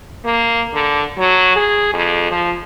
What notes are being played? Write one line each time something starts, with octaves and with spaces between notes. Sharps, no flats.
A#3
D3
F#3
G#4
F2
F3